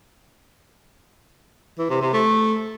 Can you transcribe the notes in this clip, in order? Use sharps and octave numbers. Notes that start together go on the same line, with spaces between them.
E3
C3
C3
A3